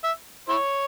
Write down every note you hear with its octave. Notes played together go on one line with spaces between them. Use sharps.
E5
E4 C#5